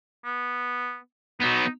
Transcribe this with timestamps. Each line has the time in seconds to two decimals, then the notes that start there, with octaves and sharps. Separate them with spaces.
0.25 B3
1.40 F#3 B3 D#4